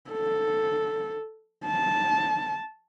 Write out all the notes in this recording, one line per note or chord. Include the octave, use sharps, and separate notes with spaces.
A4
A5